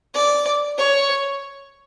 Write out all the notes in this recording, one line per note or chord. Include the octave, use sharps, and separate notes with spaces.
D5
C#5